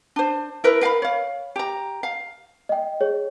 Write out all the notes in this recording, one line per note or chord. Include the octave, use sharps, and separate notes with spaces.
D4 C5
E4 A#4 B4
A#4 F5 F#5 B5
C#5 F5
G4 A#5
F5
D#5 G5
G#4 C#5